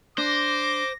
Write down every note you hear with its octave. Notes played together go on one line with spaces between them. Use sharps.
D4 C5 D6 A#6